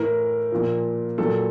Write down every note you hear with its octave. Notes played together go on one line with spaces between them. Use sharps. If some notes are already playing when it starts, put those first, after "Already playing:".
Already playing: A2 E3 A#4
A#2 F3
A#2 F#3 A4